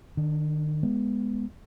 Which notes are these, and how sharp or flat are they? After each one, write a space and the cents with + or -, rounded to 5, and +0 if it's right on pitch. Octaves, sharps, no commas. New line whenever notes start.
D#3 -35 D4 +0
G#3 +0 B3 +0